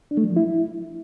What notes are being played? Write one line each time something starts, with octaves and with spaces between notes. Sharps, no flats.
D4
A3
F#3
F3
E4